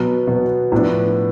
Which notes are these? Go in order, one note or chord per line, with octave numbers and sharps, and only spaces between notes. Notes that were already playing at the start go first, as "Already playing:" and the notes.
Already playing: B2 F#3 B3
B2 F#3 B3
A2 F3 B3 D4